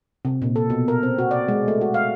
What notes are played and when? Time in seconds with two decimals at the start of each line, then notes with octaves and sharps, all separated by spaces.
0.25 C3
0.42 A#2
0.56 A4
0.70 B2
0.88 A#4
1.03 C4
1.18 F#4
1.31 D5
1.48 G#3
1.68 A3
1.81 F#4
1.94 F5